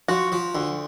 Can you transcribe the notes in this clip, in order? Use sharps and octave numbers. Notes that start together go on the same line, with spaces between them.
F3 F#4
F3
D2